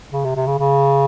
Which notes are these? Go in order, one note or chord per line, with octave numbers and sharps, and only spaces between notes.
C#3
C3
C3
C#3
C#3